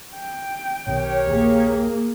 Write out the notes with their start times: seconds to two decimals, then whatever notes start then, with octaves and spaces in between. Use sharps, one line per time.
0.16 G5
0.87 B1 B2 D#3 G4 A#4 C#5
1.27 A#1 D#2 A#3 G#4